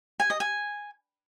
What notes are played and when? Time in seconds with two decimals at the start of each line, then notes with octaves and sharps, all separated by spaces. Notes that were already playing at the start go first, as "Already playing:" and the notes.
0.20 G#5
0.30 D#5
0.40 G#5